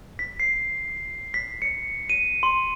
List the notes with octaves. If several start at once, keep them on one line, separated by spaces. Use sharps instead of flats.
B6
C7
B6
C#7
D#7
C6